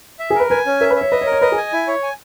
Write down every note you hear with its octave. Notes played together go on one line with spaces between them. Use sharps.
E5
G#4
A#4 B4
B4 G#5
C#4
A#4 E5
B4
E5
C#5
B4 D#5
C#5
A#4
C#5
B4 D#5
G#4
G#5
E4
C#5
G#5